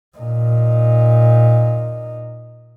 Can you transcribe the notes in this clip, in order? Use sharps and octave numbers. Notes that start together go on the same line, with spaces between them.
A#2 D#4